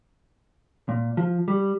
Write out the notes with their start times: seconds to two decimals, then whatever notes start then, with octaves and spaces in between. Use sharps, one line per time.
0.89 A#2
1.17 F3
1.48 G3